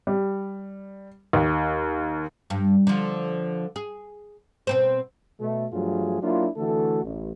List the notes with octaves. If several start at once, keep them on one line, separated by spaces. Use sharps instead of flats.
G3
D#2
G2
D3 F3
G#4
B2 C4 C5
B2 A3
G2 F3 F#3 A3 F4 G#4
F#3 A#3 D4 E4 F4
D3 E3 A3 F#4 A4
A1